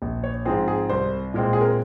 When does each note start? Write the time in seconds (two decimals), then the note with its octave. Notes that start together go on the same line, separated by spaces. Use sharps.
0.02 A#1
0.24 C#5
0.45 G#2 F3 C4 G#4
0.68 G#4
0.89 C2 C5
1.34 A#2 G#3 C4
1.53 G#4
1.61 A#4